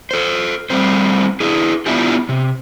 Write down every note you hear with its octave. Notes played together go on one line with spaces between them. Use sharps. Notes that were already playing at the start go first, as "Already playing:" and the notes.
A4 C5
G3 A3 C4 C5
D4 E4 G#4
B3 D4 E4 F4 G4
C3